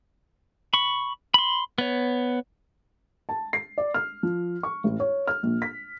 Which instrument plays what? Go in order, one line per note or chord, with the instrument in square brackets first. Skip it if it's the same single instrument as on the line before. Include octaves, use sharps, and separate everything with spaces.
[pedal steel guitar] B5 C#6
B5 C6
B3 C#5
[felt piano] A5
C7
D5
F6
F3
C#6
A1
C#5
F6
A#1
B6